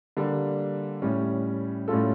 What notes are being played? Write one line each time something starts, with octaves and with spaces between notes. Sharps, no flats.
D3 G3 A#3
A2 G3 C#4
A2 G3 C#4 F4 A4